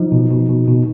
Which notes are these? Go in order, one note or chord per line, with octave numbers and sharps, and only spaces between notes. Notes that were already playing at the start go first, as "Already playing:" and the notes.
Already playing: F3 D#4
B2
B2
B2
B2